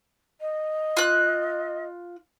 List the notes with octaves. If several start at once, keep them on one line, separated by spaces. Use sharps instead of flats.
D#5
F4 F#6